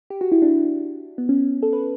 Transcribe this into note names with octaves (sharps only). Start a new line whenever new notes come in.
G4
F#4
E4
D4
B3
C#4
A4
B4